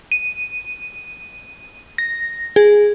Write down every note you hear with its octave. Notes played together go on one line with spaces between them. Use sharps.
D#7
A#6
G#4